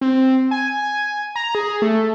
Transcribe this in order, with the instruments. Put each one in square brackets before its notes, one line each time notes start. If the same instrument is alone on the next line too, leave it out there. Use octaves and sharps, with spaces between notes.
[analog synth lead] C4
G#5
A#5
G#4
A3